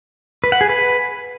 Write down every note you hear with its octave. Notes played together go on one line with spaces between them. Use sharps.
B4
F#5
G#4
B4